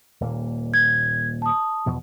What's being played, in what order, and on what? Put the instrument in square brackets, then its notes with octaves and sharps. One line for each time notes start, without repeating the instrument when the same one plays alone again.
[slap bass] D#1 A#2 A#3
[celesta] G#6
A5 D#6
[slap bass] E2 B2 F3